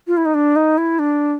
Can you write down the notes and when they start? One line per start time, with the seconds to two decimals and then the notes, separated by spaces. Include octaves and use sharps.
0.07 F4
0.17 E4
0.25 D#4
0.34 D4
0.56 D#4
0.78 E4
0.99 D4